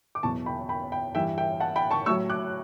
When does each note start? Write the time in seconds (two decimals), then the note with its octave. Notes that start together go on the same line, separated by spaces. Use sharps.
0.15 D6
0.23 E2 B2 F#3 A5 C#6
0.46 G5 B5
0.69 G5 B5
0.92 G5 B5
1.15 G2 E3 E5 G5
1.37 E5 G5
1.60 F#5 A5
1.76 G5 B5
1.91 A5 C#6
2.06 A2 F#3 C#6 E6
2.30 D6 F#6